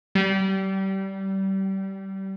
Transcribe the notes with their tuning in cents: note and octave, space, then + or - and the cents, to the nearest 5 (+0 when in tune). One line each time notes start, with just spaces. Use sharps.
G3 -25